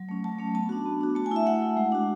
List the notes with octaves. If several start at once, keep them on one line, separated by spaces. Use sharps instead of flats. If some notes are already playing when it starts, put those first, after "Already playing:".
Already playing: F#3
A3 C#4
F#3 A5
A3 C#4
B3 A5
D4 F#4
B3
D4 F#4
A3 A5
G#5
E4 E5
A3 F#5
E4
G#3
D4 F#4